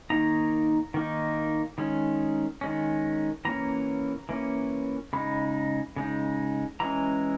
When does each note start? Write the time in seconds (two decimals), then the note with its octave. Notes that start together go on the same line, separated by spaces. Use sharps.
0.10 D#3 A#3 D#4 A#5
0.94 D#3 A#3 D#4
1.78 D#3 G#3 C#4
2.61 D#3 G#3 C#4
3.45 E3 A#3 C#4 A#5
4.29 E3 A#3 C#4
5.13 C#3 G#3 D#4 B5
5.96 C#3 G#3 D#4
6.80 E3 G#3 C#4 A#5